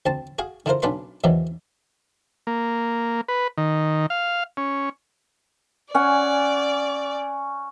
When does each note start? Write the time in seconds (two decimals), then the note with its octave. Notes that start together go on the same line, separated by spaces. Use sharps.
0.06 D2 C4 A5
0.39 F#4 G#4 F5
0.66 D3 E4 F4 A#4 C5
0.82 B1 C#4 D4 B4 F5 C6
1.24 E2 G#2 D#3 E3 F#3
2.47 A#3
3.28 B4
3.58 D#3
4.10 F5
4.57 C#4
5.94 C#4 D5 F#5 G#5